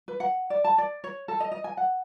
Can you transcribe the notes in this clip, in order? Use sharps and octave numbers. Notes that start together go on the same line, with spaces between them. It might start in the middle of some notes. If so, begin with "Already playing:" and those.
B4
F#5
D5
A5
D5
C#5
A4
D#5
D#5
G#5
F#5